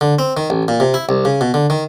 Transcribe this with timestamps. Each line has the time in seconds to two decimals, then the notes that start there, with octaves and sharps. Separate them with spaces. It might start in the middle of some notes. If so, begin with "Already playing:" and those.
0.01 D3
0.19 C4
0.37 D#3
0.50 A1
0.68 A#2
0.80 C3
0.94 E4
1.09 C2
1.25 C#3
1.41 B2
1.54 D3
1.70 D#3